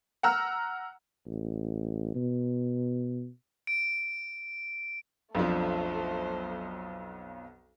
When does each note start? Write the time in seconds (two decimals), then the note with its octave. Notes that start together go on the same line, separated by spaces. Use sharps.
0.23 F#5 A#5 E6 F6
1.26 A1
2.15 B2
3.67 D7
5.35 B1 F2 F3 A3 D4 C5 D5